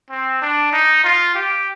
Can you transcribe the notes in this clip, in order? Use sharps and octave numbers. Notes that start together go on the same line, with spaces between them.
C4
D4
D#4
F4
G4